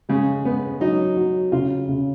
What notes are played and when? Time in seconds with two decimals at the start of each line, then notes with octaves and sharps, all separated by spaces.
0.09 C#3 G#3
0.45 G#3 B3
0.80 F#3 D#4
1.16 F#3
1.52 C#3 F4
1.89 C#3